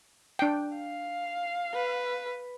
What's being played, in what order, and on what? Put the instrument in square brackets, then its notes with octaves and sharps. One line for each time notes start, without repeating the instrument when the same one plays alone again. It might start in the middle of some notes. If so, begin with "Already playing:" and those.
[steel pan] D4 G5
[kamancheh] F5
[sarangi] B4